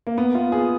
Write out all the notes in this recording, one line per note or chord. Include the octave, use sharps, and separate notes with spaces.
A#3
B3
F4
G#4